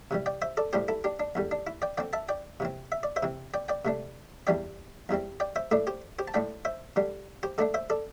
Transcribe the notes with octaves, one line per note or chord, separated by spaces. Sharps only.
C3 E3 G3
D5 G5
C5 E5
A4 D5
A2 G3 D4 G4 C5
E4 A4
D4 G4
D4
E2 D3 G3
D4
E4
D5 G5
D3 C4 D5 G5
E5 A5
D5 G5
C3 E3 C4
E5
D5
C5 E5
C3 E3 C4
D5 G5
D5 G5
C3 A3 D4
E2 E3 G3 D4 D5 G5
E2 E3 G3 C4
D5 G5
C5 E5
A2 A3 D4 A4 D5
G4 C5
G4 C5
A5
A2 A3 D4 D5 G5
C5 E5
D3 G3 D4
G4 C5
D3 A3 D4 A4 D5
C5 E5
A4 D5